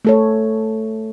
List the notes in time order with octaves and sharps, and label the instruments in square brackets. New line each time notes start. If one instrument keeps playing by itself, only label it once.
[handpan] A3 A4 C#5